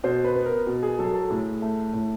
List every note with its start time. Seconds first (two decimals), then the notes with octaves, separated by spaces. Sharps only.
0.04 B2 C5
0.24 B4
0.35 B3
0.46 A#4
0.67 B2
0.83 G#4
0.99 F#3 A4
1.14 A4
1.30 A2 G#4
1.62 A3
1.93 A2